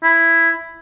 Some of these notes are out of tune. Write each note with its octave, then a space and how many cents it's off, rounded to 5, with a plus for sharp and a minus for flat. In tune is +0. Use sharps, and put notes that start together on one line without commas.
E4 +5